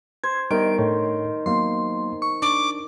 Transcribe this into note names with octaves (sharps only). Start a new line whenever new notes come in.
C5 G#6
D#3 G3 B3 D#5 D7
A2 D4 C#5
F#3 A#3 B3 C6
C#6
D4 D6